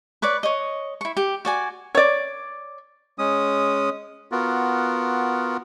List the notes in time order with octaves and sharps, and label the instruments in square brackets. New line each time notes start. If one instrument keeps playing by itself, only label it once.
[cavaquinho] B4 C#5 D5 D6
C#5 D#5
E4 C#6
G4
F#4 D5 G#5
[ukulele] C#5 D5
[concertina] G#3 C#4 D#6
B3 F4 F#4 A#4